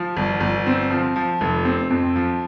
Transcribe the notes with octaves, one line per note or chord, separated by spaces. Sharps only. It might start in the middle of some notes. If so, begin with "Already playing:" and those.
Already playing: F3
G1
G1
C4
F3
F3
F1
C4
F2
F3